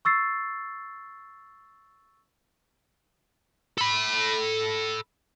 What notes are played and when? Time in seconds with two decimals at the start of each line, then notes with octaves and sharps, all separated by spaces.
0.05 C#6 E6 A6 C7
3.78 A4 B5